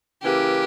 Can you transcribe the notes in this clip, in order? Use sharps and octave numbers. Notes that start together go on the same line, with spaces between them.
C#3 E3 A#3 E4 G4 B4